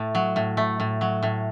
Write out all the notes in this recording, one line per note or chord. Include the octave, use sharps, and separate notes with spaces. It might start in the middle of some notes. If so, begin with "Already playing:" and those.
Already playing: A2 A3
F#3
A2
A3
A2
F#3
A2